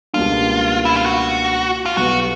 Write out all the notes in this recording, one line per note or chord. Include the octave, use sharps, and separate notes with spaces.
C#2 B2 G3 A#3 D4 F4
E4
F4
F#4
F4
B1 B2 G3 B3 F#4